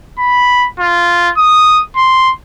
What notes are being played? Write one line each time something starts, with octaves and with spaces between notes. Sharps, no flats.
B5
F4
D#6
C6